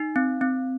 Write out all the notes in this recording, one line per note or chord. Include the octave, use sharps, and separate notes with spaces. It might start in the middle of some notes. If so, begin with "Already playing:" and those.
Already playing: D#4
C4
C4